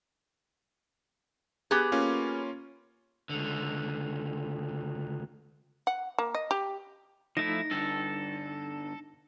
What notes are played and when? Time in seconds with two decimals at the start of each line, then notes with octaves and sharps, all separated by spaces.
1.71 B3 G4 G#4
1.92 A#3 C#4 F4
3.30 C#2 D3
5.87 F#5
6.19 A#3
6.35 D#5
6.51 G4
7.37 F3 A3 D#4 E4 A#6
7.71 G2 D3 A4